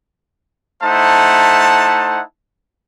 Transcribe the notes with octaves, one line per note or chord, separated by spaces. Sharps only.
A3 D#4 E4 C5 F#5 A5